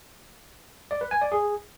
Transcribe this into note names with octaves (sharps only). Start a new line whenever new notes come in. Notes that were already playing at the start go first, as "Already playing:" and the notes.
D5
B4
G#5
D5
G#4